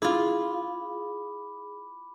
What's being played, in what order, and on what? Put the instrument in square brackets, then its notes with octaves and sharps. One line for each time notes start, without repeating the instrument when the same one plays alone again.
[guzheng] E4 F4 [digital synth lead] G#4 [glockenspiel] B5 D6